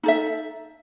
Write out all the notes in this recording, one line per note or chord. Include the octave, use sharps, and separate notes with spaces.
D#4 A4 E5